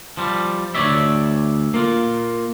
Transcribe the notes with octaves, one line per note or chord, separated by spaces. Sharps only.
F3 G3
D2 C#5 D5 E5
A#3 F4